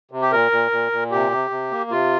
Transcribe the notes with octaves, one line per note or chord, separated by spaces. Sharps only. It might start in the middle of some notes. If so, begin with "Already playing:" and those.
C3
G4
A#2 A#4
A#2
A#2
A#2
C3 G4
C3
C3
A#3
C3 F4